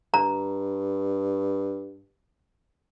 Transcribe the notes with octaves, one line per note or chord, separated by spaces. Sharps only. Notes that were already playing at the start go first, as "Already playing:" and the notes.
G2 A#5